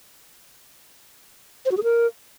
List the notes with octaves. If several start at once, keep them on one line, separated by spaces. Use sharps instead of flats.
C5
F#4
G#4
A#4